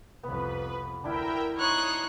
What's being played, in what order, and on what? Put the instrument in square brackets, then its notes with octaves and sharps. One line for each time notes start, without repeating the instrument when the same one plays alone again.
[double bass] C2 F2 [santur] B3 [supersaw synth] B4
[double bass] D2 [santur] D4 E4 [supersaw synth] A#4 E5 G5
[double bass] D#4 [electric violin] C#5 F#6 [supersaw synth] C6 C#6 D#6